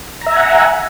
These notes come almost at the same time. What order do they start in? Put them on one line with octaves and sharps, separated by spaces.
A#5 E5 G#5 F#5